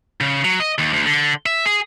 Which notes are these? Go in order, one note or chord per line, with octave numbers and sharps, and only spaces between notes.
C#3
F#3
D#5
D#2
D2
D3
E5
G#4